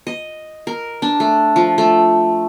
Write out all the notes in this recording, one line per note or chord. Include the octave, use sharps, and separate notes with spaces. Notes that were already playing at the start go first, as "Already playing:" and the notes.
D#5
A#4
D4
A3
F3
A3